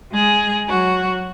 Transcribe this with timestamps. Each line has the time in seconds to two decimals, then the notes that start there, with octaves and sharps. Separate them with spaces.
0.12 G#3 G#4
0.67 F#3 F#4